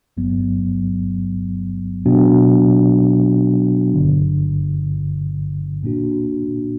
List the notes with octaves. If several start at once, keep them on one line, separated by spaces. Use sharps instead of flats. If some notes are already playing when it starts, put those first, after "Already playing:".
G1 G2 F#3 B3
B2 F#3 B3 D4 F#4
G1 G2 D3
A#2 A#3 D4 F#4